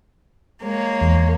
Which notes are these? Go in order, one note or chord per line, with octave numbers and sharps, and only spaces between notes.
G#3 A#3 C#5
E2